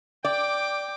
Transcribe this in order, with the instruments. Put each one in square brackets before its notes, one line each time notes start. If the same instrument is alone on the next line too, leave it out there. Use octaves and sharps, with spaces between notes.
[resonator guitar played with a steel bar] D5 [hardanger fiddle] G5 D6